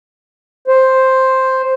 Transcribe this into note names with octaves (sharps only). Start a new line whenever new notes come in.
C5